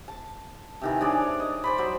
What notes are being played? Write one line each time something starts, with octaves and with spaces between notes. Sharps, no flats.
A5
C3 D#3 E3
D4 G#4 C#5 D5
D#5
C5 D5 B5
F#3 C5